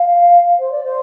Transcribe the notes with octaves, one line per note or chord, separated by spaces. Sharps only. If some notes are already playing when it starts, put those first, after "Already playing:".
Already playing: F5
C5
D5
C5